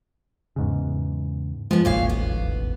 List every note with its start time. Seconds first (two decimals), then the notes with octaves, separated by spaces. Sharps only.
0.56 E2 G#2 C#3
1.71 F3 G#3 B3
1.85 E1 A1 D#2 A#2 C#5 F5
2.09 B3